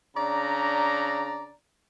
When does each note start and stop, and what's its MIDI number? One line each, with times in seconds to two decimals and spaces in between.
0.17 1.52 49
0.17 1.52 62
0.17 1.52 74
0.17 1.52 82